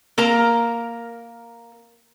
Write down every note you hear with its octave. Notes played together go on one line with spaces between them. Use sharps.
A#3 A#4 A#5